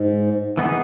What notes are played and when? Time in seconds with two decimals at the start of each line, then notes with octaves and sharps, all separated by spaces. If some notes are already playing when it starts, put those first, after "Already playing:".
Already playing: G#2
0.57 E3 B3 D#4 G#4